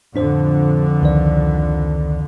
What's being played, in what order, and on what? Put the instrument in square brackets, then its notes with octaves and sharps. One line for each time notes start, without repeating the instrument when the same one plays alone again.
[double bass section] F2 D3 [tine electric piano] A2 D4 C5
[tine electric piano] C#2 D#3 D5